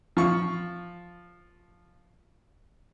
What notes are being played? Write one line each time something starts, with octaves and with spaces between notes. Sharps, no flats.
F3 C#6